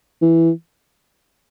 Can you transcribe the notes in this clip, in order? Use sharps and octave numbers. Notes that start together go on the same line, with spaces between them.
E3